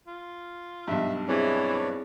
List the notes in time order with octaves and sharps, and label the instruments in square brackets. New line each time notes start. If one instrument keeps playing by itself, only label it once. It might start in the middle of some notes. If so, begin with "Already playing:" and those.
[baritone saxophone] F4
[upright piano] B1 G2 [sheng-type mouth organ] E5
[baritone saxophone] E3 [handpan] C4 E4 G#4 [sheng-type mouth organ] B4 C#5 D5